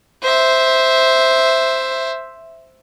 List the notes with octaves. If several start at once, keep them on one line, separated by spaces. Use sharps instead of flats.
C5 E5